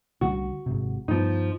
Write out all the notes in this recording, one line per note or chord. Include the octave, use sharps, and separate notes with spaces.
C2 D3 G3 F#4
G#1 G#2 C3
G2 F3 B3 D#4